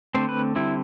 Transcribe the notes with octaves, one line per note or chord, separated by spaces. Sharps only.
D3 A3 C4 C5
B4
D3 G3 C4 E4